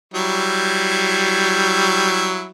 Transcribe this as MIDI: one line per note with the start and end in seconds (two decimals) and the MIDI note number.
0.14 2.49 54
0.14 2.49 55
0.14 2.49 64